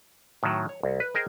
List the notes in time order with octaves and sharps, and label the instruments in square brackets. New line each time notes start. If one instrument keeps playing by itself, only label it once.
[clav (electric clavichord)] A2 D#3 F#3
C#5
C2
B4
G#4 A#4 C5 D#5 G5 G#5